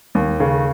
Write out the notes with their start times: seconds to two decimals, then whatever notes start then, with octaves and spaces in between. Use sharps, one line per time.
0.15 D#2
0.40 C#3